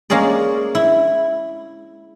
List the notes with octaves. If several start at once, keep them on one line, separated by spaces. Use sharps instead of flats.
G#3 A#3 C#4 G#4 D5
E4